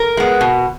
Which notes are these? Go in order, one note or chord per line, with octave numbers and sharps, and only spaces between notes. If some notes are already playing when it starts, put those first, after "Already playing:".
Already playing: A#4
G#3 B3
B2